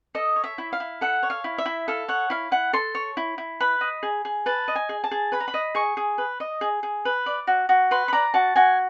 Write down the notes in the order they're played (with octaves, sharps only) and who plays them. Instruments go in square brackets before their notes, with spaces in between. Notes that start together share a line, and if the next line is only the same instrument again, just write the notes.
[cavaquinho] A4 D#5
C#5
E5
E4
F5
E4
A4 F#5
C#5
F5
E4
E5
E4
A4 F5
C#5 F#5
E4 F5
E4 F#5
A4 C6
C#5
E4
E4
B4 B5
D#5
G#4
G#4
B4 A5
D#5
G#5
G#4
A5
G#4
B4 B5
A#5
B5
D#5
G#4 C#6
G#4
B4
D#5
G#4
G#4
B4
D5
F#4
F#4
B4 C6
B5
D5 A#5
F#4 A5
F#4 G#5